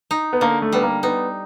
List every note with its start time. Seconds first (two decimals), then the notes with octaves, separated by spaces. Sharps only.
0.11 D#4
0.33 B3
0.41 D3 A#3
0.62 A3
0.72 G3 B3
0.82 A#3
1.03 B3 D#4